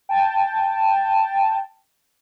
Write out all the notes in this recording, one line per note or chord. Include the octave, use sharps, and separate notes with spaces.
G5 A5